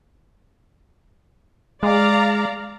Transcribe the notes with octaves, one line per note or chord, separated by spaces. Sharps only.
G#3 D5 F5 A#5